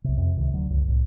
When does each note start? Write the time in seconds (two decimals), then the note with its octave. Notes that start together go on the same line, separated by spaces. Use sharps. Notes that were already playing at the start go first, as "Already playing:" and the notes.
0.04 B1 C3
0.17 F2 C3
0.37 C#2 C3 D#3
0.54 D2 D3 F#3
0.70 C#2 G2
0.88 C2 A2